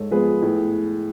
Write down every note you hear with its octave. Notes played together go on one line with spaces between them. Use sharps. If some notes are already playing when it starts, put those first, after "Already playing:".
Already playing: G#2 A4 C#5
F3 G#3 B3 G#4 B4
A2